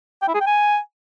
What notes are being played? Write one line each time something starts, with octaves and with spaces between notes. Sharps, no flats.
G5
E4
G#4
G5
G#5